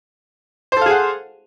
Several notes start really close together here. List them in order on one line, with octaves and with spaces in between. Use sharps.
C5 A4 F5 G#4 F#5